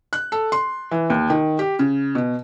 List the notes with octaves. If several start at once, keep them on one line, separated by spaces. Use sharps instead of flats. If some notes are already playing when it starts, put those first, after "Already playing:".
F#6
A4
C6
E3
D#2
D#3
G4
C#3
B2